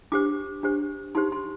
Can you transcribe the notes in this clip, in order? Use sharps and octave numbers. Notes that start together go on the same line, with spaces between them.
D4 G4 C5 D6
D4 G4 C5
D#4 G4 C5 C6
C6